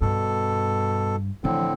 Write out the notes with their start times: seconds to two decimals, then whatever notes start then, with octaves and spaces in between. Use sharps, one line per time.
0.01 G2 B2 A4
1.44 A2 D3 E3 F3 C4